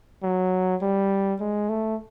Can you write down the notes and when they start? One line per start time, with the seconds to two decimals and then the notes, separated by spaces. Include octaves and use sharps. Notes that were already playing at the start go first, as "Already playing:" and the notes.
0.23 F#3
0.82 G3
1.40 G#3
1.69 A3